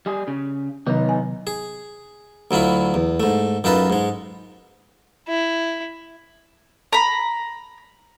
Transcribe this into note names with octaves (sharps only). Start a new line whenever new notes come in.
G3 G#4
C#3
C3 D#3 F#3 B3 D#4
G#5
G#4
D2 F#3 E4 F4 B5
E2
G#2 A3
F#2 D#4 F4 A4 B4
G#2 G#3
E4
A#5 B5